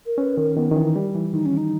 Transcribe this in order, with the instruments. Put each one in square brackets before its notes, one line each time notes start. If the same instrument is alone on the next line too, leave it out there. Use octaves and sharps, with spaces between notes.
[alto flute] A#4
[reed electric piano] C#4 [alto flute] B4
[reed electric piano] D#3 [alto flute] A#4
[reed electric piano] D#3 [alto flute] B3
[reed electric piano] D#3 [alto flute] C#4
[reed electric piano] E3
[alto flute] D#4
[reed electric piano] G3
E3
[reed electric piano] D#3 [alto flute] D#4
[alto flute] C#4
D#4